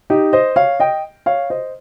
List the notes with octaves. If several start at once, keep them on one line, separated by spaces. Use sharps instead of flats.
D#4 G4
C5 D#5
C#5 F5
D#5 G5
C#5 F5
C5 D#5